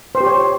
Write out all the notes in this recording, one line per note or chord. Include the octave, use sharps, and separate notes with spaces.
C5
G4
C#5